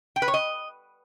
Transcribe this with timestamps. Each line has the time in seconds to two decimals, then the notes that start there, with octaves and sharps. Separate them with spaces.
0.16 G5
0.22 B4
0.28 C#5
0.34 D#5